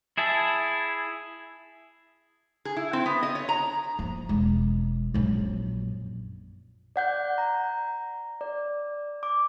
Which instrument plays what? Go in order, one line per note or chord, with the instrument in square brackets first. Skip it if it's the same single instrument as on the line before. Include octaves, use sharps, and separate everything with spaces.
[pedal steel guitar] E4 G#4 E5 A5
[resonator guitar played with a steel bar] G#4
E4
C4
B3
D#5
C#5
A#5
[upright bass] F3 A#3
E1 G#3
A#1 F#2
[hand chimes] D5 F#5 G6
A#5
D5
D6